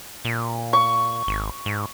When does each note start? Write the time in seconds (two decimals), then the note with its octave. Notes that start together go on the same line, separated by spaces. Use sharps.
0.25 A#2
0.73 C#6
1.27 G#1
1.66 G#2